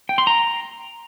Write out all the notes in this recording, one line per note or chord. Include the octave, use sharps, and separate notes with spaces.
G5
C6
A#5